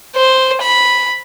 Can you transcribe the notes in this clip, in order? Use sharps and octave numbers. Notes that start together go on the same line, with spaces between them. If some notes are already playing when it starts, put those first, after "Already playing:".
C5
B5